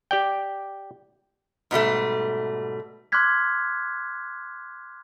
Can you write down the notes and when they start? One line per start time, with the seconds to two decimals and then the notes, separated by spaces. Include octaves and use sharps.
0.11 G4 D5 G5
1.71 G#2 B2 G3 A3
3.12 C6 D6 F6 F#6 G#6 B6